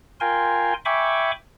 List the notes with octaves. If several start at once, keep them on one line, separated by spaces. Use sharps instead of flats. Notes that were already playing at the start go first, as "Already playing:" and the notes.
F4 A#4 G5 G#5 C6
E5 G5 G#5 B5 C#6 D6